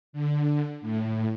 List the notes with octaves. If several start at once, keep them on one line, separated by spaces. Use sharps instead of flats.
D3
A2